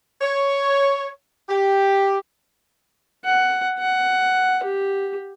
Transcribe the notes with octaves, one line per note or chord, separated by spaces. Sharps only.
C#5
G4
F#5
F#5
G4